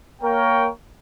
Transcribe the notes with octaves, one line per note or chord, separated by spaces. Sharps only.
A#3 A#4 C#5 G5